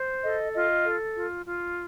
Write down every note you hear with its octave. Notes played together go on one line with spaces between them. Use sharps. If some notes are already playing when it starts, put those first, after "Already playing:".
Already playing: C5
A4 D#5
F4 D#5
A4
F4
F4